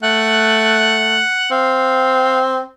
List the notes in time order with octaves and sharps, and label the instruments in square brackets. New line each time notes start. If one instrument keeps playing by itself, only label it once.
[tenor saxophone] A3 [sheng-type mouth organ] F#5 F#6
[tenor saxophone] C4 [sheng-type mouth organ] F5